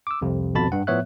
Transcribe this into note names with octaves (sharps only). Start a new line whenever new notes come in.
D6 E6
C2 F2 C3
G#1 F2 B2 A5 B5 A6
G2 F#5
A2 F3 B3 C#5 E5 F#6